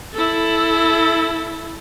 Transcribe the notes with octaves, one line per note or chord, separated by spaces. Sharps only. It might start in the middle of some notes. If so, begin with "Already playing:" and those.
E4 A4